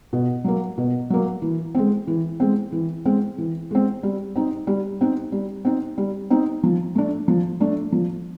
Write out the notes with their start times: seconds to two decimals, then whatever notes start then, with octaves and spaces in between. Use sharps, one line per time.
0.13 B2
0.44 F#3 A#3
0.78 B2
1.10 F#3 A#3
1.42 E3
1.75 G#3 C4
2.07 E3
2.40 G#3 C4
2.72 E3
3.05 G#3 C4
3.38 E3
3.71 G#3 C4
4.03 G3
4.36 C4 D#4
4.67 G3
5.01 C4 D#4
5.32 G3
5.65 C4 D#4
5.98 G3
6.30 C4 D#4
6.63 F3
6.95 A3 D4
7.28 F3
7.60 A3 D4
7.92 F3